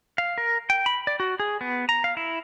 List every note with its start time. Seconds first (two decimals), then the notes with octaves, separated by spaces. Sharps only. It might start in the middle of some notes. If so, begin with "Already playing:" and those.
0.18 F5
0.38 A#4
0.70 G5
0.86 B5
1.07 D5
1.20 F#4
1.40 G#4
1.61 B3
1.89 A#5
2.04 F5
2.17 E4